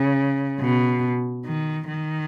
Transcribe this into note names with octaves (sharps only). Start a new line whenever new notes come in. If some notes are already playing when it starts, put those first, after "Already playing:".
Already playing: C#3
B2
D#3
D#3